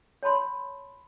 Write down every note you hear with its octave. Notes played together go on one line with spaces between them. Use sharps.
C#5 A5 B5 C6